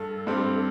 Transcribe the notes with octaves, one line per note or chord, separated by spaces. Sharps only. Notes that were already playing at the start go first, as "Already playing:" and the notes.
Already playing: G2 A4
G2 G3 C4